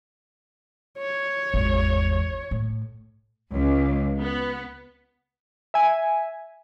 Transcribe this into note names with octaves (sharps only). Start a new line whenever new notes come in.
C#5
G#1 E2
A2
C#2
B3
E5 G#5